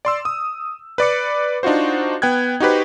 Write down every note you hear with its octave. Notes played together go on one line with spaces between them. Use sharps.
D5 C6 E6
D#6
B4 D5 D6 C#7
D4 D#4 F4 F#4 C5
B3 G5 F#6 G#6
D#4 F#4 G4 B4 C5